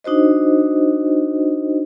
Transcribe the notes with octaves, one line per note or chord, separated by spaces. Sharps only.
D4 D#4 F#4 C5 D#5